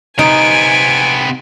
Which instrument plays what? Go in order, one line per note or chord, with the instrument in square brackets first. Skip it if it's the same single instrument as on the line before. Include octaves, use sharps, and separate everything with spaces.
[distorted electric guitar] C3 B3 [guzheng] D#4 [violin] G#5 [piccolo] D7